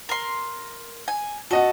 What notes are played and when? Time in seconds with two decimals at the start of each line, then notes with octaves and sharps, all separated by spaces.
0.09 A#4 C6
1.08 G#5
1.51 F#4 A4 D#5 F#5